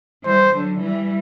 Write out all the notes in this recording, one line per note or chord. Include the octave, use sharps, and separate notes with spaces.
E3 G3 C5
D3 F#3
E3 G3